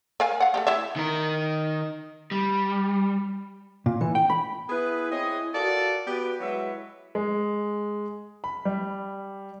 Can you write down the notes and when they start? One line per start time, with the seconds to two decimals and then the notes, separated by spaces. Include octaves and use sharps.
0.20 A#4 F5 G#5
0.40 F5 F#5
0.54 A3 F#4 G4
0.67 E4 G4 E5
0.96 D#3 A#4
2.31 G3
3.86 A#2
4.01 E3
4.15 G5
4.30 B5
4.69 B3 E4 G#4 B4
5.11 C4 E4 G#4 C#5 D#5
5.54 F4 F#4 A4 A#4 D5
6.07 B3 F#4 G4 B4
6.41 F#3 G#3 E4 B4 C#5 E5
7.15 G#3
8.44 B5
8.65 G3